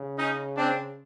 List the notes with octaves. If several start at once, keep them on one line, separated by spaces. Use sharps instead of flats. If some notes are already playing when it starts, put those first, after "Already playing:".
Already playing: C#3
C#4 D#4
C4 D4